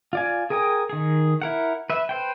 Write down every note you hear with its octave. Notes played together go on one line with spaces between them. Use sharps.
F4 D5 G#5
G#4 A#4 G5 G#5 D#6
D#3 G#4
E4 A#4 F#5
B4 E5
B4 C5 G5